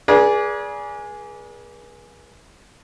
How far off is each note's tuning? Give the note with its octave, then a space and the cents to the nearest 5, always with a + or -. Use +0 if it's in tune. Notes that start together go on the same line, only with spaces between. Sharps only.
G#4 +0 B4 -45 D5 -20